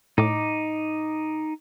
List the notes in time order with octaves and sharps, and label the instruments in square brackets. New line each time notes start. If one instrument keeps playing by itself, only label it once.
[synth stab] A2 [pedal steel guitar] D#4 D6